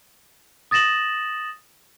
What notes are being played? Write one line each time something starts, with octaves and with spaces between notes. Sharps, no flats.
D#6 A6 A#6 E7 F#7